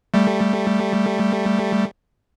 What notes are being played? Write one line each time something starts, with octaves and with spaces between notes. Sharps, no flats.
G3 A3